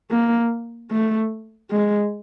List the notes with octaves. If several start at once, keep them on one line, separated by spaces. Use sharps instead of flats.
A#3
A3
G#3